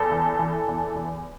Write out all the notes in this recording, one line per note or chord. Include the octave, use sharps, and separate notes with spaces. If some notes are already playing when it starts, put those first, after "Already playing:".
Already playing: E2 A4
E3
E3
E2
E2